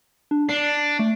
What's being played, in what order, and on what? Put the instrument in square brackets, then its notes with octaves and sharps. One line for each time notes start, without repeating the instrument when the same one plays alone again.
[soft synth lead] D4
[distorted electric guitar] D4 [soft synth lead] C7
[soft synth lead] A3